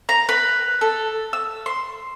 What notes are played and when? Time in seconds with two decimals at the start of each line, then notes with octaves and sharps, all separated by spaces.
0.09 A#5
0.29 B4
0.81 A4
1.33 E6
1.66 C6